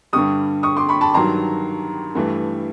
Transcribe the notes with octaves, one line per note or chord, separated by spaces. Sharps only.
G2 D3 G3 C#6 D#6
C#6 D#6
C6 D6
B5 C#6
A5 B5
G2 D#3 F#3 A#5 C6
G2 E3 A3